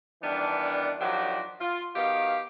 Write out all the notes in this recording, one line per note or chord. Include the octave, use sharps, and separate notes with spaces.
D#3 E3 G3 B3 D4
D#3 F3 F#3 D4 F#4 G4
F4
B2 D#3 B3 G4 F5